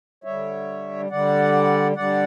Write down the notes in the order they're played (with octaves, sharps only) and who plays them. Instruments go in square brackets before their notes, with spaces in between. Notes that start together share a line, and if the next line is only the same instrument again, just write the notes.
[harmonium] D3 G3 C#5 E5
D3 G3 D5 F#5
D3 G3 D5 F#5